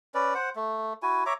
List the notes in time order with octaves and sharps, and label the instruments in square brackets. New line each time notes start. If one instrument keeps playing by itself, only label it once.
[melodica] C#4 B4 D5
C5 F#5
A3
E4 F#4 G#5
C#5 E5 A#5 D6